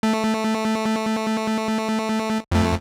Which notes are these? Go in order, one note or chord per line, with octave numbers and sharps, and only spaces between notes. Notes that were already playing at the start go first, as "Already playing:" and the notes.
A3
F2 A3